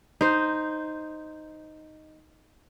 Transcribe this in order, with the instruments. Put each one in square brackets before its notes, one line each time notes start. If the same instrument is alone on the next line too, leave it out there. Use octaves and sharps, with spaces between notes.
[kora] D#4 C5